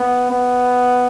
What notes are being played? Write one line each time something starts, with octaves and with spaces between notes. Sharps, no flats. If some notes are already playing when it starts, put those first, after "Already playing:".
Already playing: B3
B3